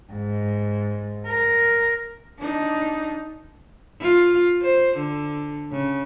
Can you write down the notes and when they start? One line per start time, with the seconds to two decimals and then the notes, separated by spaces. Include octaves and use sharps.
0.13 G#2
1.28 A#4
2.39 D4 D#4
4.02 F4
4.63 C5
4.98 D3
5.72 C#3